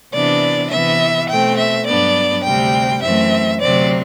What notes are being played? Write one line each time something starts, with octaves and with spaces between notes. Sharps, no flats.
C3 E3 B3 D4 D5
C3 E3 B3 E5
B2 A3 C4 G5
E5
G2 F#3 B3 D4 D5
D2 C3 G3 C4 G5
F#2 E3 A3 C4 E5
D2 C3 F#3 C4 D5